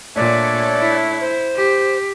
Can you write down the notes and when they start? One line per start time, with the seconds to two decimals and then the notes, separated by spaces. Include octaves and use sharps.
0.16 A#2 A3 D4 C#5 D5
0.78 E4
1.21 C5
1.55 G4